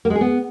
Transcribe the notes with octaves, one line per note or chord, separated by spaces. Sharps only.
A#3
G#3
G#4
B3